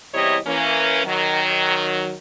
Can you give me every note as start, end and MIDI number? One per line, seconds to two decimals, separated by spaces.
0.13 0.37 40
0.13 0.37 48
0.13 0.37 55
0.13 0.37 64
0.13 0.37 73
0.13 0.37 75
0.46 1.03 52
0.46 1.03 58
0.46 1.03 61
1.05 2.12 51
1.05 2.12 54